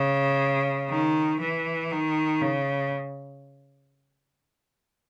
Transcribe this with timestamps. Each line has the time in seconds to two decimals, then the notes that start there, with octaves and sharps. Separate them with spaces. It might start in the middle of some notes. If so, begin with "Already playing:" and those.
Already playing: C#3
0.90 D#3
1.41 E3
1.92 D#3
2.41 C#3